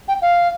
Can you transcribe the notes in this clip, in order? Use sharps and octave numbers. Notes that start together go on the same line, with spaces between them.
G5
F5